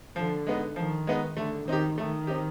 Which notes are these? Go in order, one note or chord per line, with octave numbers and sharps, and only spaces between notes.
D3 F3
G#3 B3 D#4
D#3 F3
G#3 B3 D#4
D3 A3
D#3 C4 D#4 G4
D#3 A3
C4 D#4 G4